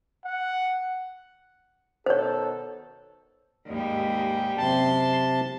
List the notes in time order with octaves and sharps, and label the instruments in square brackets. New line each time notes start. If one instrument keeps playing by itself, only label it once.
[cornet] F#5
[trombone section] B2 D#3 A4 [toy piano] C5 C#5
[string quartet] D#2 G#2 G3
[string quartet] F#2 C6 [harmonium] C3 A5